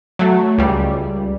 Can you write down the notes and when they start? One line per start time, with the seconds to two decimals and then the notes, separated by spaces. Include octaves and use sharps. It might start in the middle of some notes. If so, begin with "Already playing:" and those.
0.19 F#3 A3
0.58 C#2 G3